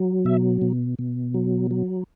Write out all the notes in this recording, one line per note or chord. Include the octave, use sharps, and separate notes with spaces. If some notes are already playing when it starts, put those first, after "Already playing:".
Already playing: F#3
B2 E5
B2
B2
F#3
F#3